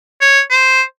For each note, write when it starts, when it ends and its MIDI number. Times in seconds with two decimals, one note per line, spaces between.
0.21 0.41 73
0.50 0.82 72